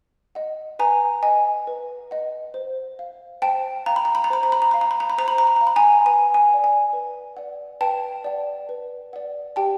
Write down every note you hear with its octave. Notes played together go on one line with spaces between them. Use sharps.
D#5 F#5
B4 G#5 A#5
D#5 F#5 G#5
B4
D#5 F#5
C5
F5
C5 G5 A5
F5 A#5
B5
A#5
B5
A#5
C5 B5
A#5
B5
A#5
F5 B5
A#5
B5
A#5
B5
C5 A#5
B5
A#5
B5
A#5
F5
B5
G#5 A#5
B4 G#5
G#5
D5 F#5
G#5
B4
D5 F#5
B4 G5 A5
D5 F#5
B4
D5 F#5
G4 G5 A5